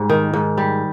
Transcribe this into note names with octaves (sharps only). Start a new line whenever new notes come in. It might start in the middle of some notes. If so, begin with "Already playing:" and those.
Already playing: G#2 G3
D#3
G#2
G3